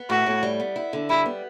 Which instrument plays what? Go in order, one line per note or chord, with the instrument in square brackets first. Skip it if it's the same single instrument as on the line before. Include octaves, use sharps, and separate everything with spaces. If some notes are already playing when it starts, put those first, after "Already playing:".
Already playing: [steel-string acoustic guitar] B3
[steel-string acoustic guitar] A2 [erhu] F#4
[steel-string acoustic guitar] A2
G3
B3
E4
D3
[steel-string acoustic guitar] G3 [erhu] E4
[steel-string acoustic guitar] B3